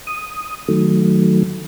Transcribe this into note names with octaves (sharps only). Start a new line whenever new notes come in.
D#6
D#3 F#3 A3